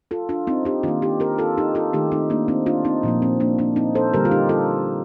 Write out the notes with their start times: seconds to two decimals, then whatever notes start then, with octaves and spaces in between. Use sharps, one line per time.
0.11 F4 A4
0.29 D4 F4
0.47 C4 D#4
0.65 D#4 G4
0.83 D#3 A#3 D4 F4
1.02 D#4 G4
1.20 G4 A#4
1.38 F4 A4
1.58 D#4 G4
1.75 F4 A4
1.93 D#3 A3 D#4 G4
2.12 C4 D#4
2.30 A#3 D4
2.48 C4 D#4
2.66 D4 F4
2.85 C4 D#4
3.03 A#2 F3 A#3
3.22 C4
3.40 A#3 D4
3.59 A#3 D4
3.76 C4 D#4
3.95 A4 C5
4.14 D3 G3 A#3 G4 A#4
4.25 F4
4.31 D#4 G4
4.49 F4 A4